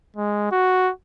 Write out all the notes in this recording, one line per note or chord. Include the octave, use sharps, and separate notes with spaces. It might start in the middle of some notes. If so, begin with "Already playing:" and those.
G#3
F#4